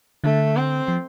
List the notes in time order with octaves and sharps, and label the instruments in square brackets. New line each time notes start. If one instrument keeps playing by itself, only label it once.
[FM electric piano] D3 [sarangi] A3
[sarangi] C4
[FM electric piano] F3